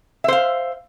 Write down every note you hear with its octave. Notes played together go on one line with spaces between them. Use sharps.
C5 E5 F5